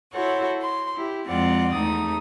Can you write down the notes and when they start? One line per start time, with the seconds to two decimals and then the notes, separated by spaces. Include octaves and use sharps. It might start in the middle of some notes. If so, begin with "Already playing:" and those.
0.13 E4 F#4 A4 C5 C#5 F#5
0.62 C6
0.96 E4 G4
1.28 F2 G#3 C4 F4 D5 F#5
1.73 E2 A3 D#4 D#6